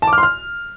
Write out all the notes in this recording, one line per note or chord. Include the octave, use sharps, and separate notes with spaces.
A5
D6
F6
C6
F6